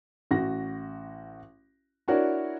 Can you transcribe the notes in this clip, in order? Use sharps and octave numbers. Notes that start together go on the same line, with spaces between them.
A1 F#4 A#6
D4 E4 F#4 A#4 C#5 D5